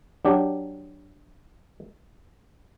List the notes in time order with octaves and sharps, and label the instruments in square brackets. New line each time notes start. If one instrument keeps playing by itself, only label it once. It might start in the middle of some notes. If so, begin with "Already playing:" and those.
[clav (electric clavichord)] F#3 D4 G4